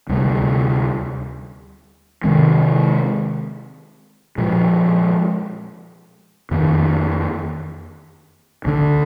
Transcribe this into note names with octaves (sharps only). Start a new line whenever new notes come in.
D2 C3 G3
C3 D#3 G#3 C4
A#2 F3 G#3
F2 D#3 A#3
D2 D3 G#3 D4